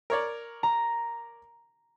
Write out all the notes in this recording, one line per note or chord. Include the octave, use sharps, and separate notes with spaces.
A#4 C#5 D5
A#5